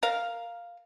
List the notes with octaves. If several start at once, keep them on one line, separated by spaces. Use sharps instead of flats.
A#4 F5